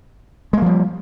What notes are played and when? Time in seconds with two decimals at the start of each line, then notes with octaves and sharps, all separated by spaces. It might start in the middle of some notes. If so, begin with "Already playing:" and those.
0.53 G#3
0.58 A#3
0.62 F3
0.66 G3